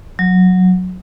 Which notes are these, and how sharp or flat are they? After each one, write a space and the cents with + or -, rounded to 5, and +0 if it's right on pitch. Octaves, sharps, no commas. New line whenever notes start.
F#3 -10